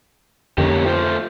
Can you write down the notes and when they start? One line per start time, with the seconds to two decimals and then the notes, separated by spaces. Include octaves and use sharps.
0.58 F2 D3 A#3 C#4 G4
0.86 A3 F4 C5